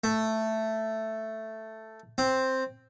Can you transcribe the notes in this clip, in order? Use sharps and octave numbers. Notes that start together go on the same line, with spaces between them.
A3
C4